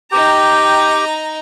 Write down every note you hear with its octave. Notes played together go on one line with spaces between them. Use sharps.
D#4 G4 G5 A#5